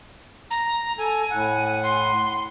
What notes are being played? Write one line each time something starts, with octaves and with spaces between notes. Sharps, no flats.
A#5
A4 G#5
A2 F#5
C6